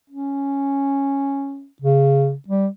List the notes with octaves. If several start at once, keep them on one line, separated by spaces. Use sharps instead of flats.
C#4
C#3
G3